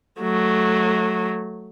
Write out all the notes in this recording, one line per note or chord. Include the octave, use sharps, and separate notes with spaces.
F#3 A3